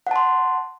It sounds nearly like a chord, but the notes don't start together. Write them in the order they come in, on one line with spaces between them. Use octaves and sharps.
F#5 A5 C6